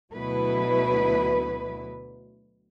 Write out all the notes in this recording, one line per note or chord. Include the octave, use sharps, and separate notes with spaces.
D2 B2 F#3 E4 B4